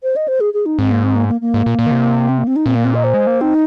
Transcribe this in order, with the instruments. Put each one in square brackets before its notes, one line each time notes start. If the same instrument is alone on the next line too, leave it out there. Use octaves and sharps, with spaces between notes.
[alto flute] C5
D#5
C5
G#4
G#4
D#4
[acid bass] G#2 [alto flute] C4
[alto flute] A#3
C4
A#3
A#3
A#3
[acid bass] G#2
A#2
A#2
D#3
C3
[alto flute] C4
A#3
C4
D#4
[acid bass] A#2 [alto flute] C4
[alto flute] A#3
C4
D#5
C5
[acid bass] G#3
A#3
[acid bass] C4 [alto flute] D#4